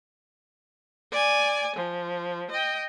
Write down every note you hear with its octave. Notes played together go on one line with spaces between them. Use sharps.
D5 G#5
F3
D#5 G5